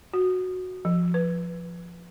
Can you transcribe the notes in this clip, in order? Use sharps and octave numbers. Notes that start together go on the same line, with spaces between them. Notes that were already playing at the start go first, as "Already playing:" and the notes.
F#4
F3
B4